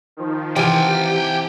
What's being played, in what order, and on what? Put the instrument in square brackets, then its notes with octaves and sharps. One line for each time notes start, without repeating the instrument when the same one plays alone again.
[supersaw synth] D#3 F3
[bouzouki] C3 F4 [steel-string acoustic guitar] E3 [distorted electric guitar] G5 G#5
[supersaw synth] G4